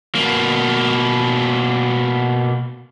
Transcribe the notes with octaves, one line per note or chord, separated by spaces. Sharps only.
B2 A#3